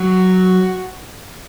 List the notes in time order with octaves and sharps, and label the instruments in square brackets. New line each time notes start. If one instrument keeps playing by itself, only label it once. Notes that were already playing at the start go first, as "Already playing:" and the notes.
Already playing: [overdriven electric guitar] F#3 [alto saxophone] F#4